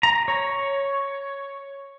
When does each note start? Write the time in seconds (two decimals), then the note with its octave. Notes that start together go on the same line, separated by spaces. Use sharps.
0.03 A#5
0.28 C#5